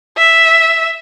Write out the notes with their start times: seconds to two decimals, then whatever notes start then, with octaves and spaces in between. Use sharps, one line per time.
0.17 E5